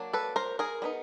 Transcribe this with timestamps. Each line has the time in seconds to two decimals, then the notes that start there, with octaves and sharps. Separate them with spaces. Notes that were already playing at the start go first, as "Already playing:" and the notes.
Already playing: F#3 A#3 D4
0.13 A4 B4
0.36 A#4 C5
0.59 G#4 A#4
0.82 G3 B3 D#4